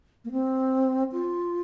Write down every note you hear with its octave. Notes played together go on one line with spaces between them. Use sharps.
A#3
C4
F4